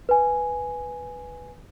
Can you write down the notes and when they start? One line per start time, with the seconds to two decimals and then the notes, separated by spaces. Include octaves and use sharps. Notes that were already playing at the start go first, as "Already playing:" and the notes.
0.09 B4 G#5